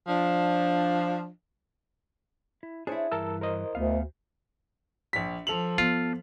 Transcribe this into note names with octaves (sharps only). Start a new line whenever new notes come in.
F3 D4
E4
D4 E4 G#4 C5 C#5
G2 E3 A#4 A5 E6
A#4 C5 D#5
D2 A3 B3 F5
A#1 B6
F3 A4 F7 F#7
B3 F4